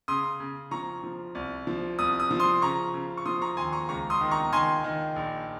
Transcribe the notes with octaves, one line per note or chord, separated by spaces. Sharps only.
C#3 C6 D#6
C#3
F3 A#5 C#6
F3
C2
F3
C2 D#6
D#6
F3
C6 D#6
C#3 A#5 C#6
C#3
C#6
F3 C6 D#6
A#5 C#6
D#2 G#5 C6
A#5 C#6
C#2 A#5 C#6
C6 D#6
D#3
A#5 C#6
D#3 G#5 C6
D#3
A#1